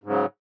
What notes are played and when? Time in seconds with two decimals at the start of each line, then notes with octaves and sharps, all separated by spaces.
0.04 G#2
0.06 C#3
0.09 F#3